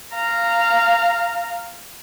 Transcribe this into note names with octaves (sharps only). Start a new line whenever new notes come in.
F5 A#5